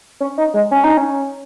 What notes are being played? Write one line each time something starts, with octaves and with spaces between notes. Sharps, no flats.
C#4
D#4
G#3
C#4
D#4
C#4